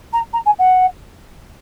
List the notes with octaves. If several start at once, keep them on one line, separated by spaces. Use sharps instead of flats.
A#5
A#5
G#5
F#5